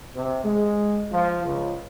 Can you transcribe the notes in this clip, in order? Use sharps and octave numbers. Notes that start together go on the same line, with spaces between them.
C3
G#3
F3
C#2